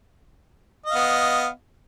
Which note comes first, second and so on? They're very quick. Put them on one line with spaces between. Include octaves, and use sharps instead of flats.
D#5 F5 B3